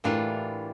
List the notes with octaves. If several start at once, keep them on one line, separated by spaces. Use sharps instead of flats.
A2 E3 G3 A#3 D4 F4